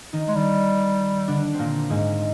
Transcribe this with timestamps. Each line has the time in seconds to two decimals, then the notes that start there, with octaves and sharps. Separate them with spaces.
0.13 D#3 D#4
0.28 G#3
0.35 D#3 G3 D#4
1.28 D3 D4
1.53 C4
1.59 A#2 A#3
1.90 G#2 G#3